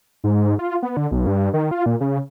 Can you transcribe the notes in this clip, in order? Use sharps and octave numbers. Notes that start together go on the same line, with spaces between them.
G#2
F4
B3
D3
B1
G2
D#3
F4
A#2
C#3